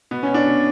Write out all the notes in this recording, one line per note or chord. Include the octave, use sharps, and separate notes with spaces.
B2 B3
C#4
B2
D4
B2